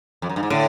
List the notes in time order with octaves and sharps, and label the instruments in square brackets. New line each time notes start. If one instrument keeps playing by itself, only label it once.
[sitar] F2
F#2
G2
G#2
[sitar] A2 [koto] D3